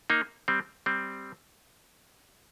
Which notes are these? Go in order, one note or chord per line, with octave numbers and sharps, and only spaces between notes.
A#3 D#4
G3 C4
G3 C4